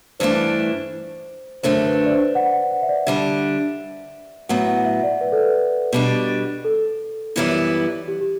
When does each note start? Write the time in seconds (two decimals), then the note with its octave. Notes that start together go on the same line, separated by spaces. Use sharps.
0.20 G2 E3 A3 D4 C5
1.63 F#2 D3 A3 D4 C5
1.87 B4
2.06 D5
2.11 C5
2.35 F#5
2.53 F#5
2.71 F#5
2.82 E5
2.89 D5
3.06 D3 G3 D4 E5
4.49 A2 F#3 B3 F#5
4.67 F#5
4.85 E5
5.03 D5
5.21 B4
5.32 A4
5.43 B4
5.93 B2 G3 D4
6.65 A4
7.36 F#2 E3 G3 B3 E4
8.08 G4
8.21 G4